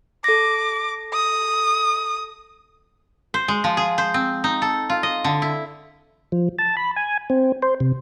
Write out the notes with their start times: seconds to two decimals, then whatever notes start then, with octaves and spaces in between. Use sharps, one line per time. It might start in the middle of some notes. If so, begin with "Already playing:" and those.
0.24 A4 D6 A#6
1.13 D#6
3.34 C5
3.48 G#3
3.64 F3
3.77 G#4
3.98 C5
4.14 C4
4.44 D#4
4.62 A4
4.90 F4
5.03 D#5
5.24 D3
5.42 E4
6.32 F3
6.59 A5
6.77 B5
6.96 G#5
7.30 C4
7.62 C5
7.80 C3